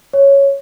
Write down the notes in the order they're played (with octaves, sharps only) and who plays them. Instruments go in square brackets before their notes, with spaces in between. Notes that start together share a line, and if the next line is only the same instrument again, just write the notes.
[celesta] C#5